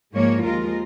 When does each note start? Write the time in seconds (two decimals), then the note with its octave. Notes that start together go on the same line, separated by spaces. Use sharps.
0.13 G#2 F3 G#3 A#3 C#5
0.43 D#2 F3 G#3 F4 A#4